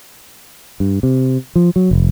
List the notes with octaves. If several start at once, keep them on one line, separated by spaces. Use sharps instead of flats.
G2
C3
F3
F#3
F1